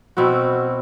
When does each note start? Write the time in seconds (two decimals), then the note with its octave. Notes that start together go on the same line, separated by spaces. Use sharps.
0.17 B2 C4 E4 F#4